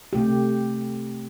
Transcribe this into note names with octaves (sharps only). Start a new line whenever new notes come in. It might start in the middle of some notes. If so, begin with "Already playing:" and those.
C3 A3 G4